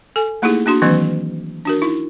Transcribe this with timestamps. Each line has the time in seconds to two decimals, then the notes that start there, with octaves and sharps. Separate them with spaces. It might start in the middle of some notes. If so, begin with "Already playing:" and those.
0.16 A4 G#5
0.42 A3 A#3 D#4 E4 G4 G#4
0.66 A#3 D4 F#4 C6
0.82 D#3 E3 F#3 A#3 C4 D4
1.65 D4 F#4 A#4
1.82 D#4 E4